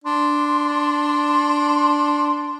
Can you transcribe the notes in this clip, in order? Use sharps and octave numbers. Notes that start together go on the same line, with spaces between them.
D4 C6